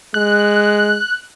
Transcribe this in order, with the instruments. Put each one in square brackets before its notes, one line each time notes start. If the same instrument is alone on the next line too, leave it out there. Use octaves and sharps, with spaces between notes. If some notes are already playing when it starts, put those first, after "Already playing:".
[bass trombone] G#3 [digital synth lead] F#6